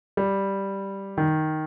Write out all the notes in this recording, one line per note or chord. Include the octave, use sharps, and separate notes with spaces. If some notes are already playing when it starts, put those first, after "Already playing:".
G3
D#3